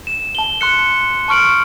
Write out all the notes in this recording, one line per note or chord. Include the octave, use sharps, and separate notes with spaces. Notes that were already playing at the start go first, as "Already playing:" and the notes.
E7
A5 G7
C6 F#6 C#7
A5 C#6 F6 D7 F#7